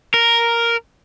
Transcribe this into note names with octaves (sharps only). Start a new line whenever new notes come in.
A#4